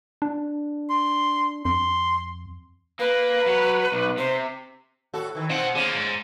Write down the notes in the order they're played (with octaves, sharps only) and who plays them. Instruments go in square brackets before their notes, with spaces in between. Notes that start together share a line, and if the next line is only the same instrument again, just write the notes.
[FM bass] D4
[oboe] C6
[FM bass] F2 [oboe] C6
[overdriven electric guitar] A#3 [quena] B4
[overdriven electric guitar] F#3 C#5
B1
[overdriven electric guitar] C3 [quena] C5
[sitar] A2 F#4 A4
D#3 E3
[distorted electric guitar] B2 F#5 [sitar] C4 D#4 F4
[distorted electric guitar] D3 A#3 [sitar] C#4 F4 G#4
[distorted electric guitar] G#2